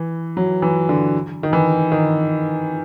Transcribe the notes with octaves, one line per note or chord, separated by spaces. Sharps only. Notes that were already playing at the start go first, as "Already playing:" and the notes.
Already playing: E3
F#3
E3
D3
D#3
E3
D#3